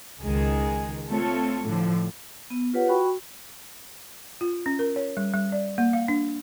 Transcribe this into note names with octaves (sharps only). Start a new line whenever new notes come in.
C#2 D#3 G#3 G#4
A3 C4 F4 A4 C#5
A2 D3 F3
B3
F4 G4 B4 C#5 F#5
F#4 G5 B5 C#6
F4
C#4
A#4
C#5
G3
G3
D5
A#3
F5
D4